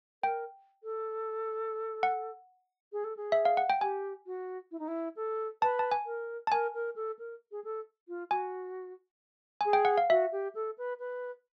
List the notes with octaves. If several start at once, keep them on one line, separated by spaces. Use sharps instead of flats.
A#4 G5
A4
F#5
G#4
A4
G#4
E5
F5
F#5
G5
G4 G#5
F#4
E4
D#4
E4
A4
B4 A5
A5
G#5
A#4
A5
A#4 G#5
A#4
A4
A#4
G#4
A4
F4
F#4 G#5
G#4 G#5
G5
F#5
F5
F#4 E5
G4
A4
B4
B4